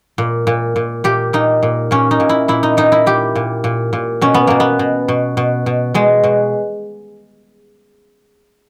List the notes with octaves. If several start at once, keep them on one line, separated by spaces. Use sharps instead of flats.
A#2
A#2
A#2
A#2 G4
A#2 D#4
A#2
A#2 C#4
D#4
A#2
E4
A#2 E4
D#4
A#2 D#4
E4
A#2 G4
A#2
A#2
A#2
B2 C#4
B3
B2 A#3
B3
B2
B2
B2
B2
B2 G#3
B2